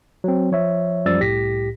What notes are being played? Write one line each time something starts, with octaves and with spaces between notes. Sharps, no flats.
F#3 C4
F3 C#5 E5
F#2 F3 G3 D5 E6 A6
C2 A2 G4 A#6 B6